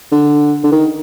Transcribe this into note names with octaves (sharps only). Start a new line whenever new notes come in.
D3
D3
D#3